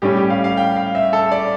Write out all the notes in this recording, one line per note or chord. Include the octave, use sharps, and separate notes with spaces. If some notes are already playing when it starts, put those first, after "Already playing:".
A2 G3 C#4 G4
G4
F5
F5
G5
F5
E5
A4
D5